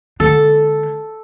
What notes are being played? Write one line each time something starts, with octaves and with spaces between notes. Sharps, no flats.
D3 G#3 A4